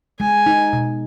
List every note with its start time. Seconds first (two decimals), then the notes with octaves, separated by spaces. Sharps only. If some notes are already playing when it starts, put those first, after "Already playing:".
0.20 G#3 G#5
0.46 D#4
0.73 B2